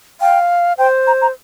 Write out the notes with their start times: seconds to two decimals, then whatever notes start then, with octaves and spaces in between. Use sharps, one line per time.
0.21 F5 G5
0.78 C5 G5
1.07 A#5
1.22 A#5